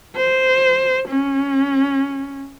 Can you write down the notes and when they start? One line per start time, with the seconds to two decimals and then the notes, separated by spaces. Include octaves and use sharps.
0.16 C5
1.08 C#4